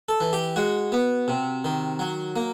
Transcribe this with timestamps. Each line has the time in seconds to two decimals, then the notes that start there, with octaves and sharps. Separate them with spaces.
0.09 A4
0.20 E3
0.33 G4
0.56 G#3 F#4
0.92 B3
1.28 C3
1.64 D#3
1.99 F#3
2.36 A#3